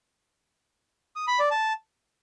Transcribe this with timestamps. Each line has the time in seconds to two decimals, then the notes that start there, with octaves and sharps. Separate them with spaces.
1.16 D#6
1.28 B5
1.39 D5
1.51 A5